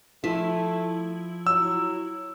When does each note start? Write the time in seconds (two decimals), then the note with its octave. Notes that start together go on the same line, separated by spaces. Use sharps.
0.24 F3 A3 E4
1.47 F#3 E6